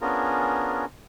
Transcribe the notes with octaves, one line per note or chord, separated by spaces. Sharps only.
B3 C#4 D4 F4 G#4 A#4